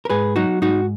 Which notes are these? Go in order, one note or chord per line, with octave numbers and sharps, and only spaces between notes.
A#4
G#2 G#4 B4
F#3 D#4 F#4
G#2 D#4 F#4